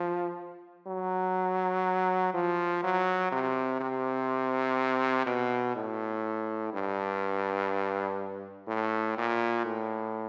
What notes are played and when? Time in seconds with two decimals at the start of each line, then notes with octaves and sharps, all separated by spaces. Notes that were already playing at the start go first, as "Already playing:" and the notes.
Already playing: F3
0.87 F#3
2.34 F3
2.83 F#3
3.32 C3
3.80 C3
5.26 B2
5.76 A2
6.73 G2
8.68 A2
9.18 A#2
9.65 A2